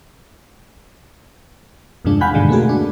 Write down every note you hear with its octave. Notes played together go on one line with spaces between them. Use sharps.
E2 G2 C3 F3 G#3 D4
F5 F#5 G#5 B5 F#6 G6
G2 B2 D3 D#3 G#3
A3 A#3 C4 F#4 G#4
D4